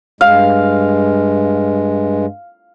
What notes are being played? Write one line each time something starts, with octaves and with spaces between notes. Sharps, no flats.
G2 G#3 F5